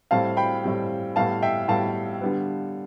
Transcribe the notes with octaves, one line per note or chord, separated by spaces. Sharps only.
A2 G3 C4 F5 A5
G5 B5
A2 G3 C4
A2 G3 B3 F5 A5
E5 G5
A2 G3 B3 F5 A5
D3 G3 B3